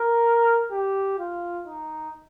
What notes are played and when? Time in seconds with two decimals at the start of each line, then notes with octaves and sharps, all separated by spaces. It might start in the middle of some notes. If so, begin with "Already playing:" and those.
Already playing: A#4
0.72 G4
1.19 F4
1.67 D#4